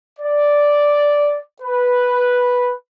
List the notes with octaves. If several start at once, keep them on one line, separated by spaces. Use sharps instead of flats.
D5
B4